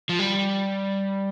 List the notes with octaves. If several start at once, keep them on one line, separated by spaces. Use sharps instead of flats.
F3
G3